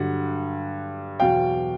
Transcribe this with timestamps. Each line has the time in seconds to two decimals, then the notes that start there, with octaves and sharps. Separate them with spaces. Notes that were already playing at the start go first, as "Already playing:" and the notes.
Already playing: G2 D3 F#3 F#5
1.20 E2 B2 F#3 F5 G5